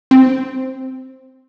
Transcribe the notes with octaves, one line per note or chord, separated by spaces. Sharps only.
C4